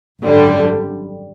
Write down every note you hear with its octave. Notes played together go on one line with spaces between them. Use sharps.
G#1 F#2 D3 G3